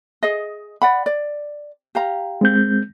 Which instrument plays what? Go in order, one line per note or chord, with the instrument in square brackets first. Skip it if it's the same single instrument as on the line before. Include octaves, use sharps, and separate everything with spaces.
[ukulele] G#4 D#5
D5 F#5 B5
D5
G4 F5 A#5
[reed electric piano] G#3 C4 G6